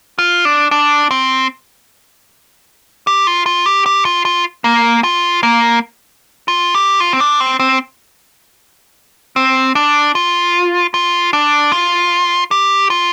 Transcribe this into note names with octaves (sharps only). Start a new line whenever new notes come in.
F4
D4
D4
C4
G4
F4
F4
G4
G4
F4
F4
A#3
F4
A#3
F4
G4
F4
C4
D4
C4
C4
C4
D4
F4
F4
D4
F4
G4
F4